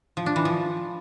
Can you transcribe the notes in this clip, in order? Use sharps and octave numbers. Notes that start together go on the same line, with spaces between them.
F3
D4
E3
F3